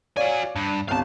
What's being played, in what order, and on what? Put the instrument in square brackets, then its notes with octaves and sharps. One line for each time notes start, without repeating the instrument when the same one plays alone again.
[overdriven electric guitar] F#4 G#5 [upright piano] C#5 D5 F5
[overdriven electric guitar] G2
[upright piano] G1 C2 [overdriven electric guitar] F5 A5